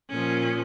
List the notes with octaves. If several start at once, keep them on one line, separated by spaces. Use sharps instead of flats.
A#2 F3 C#4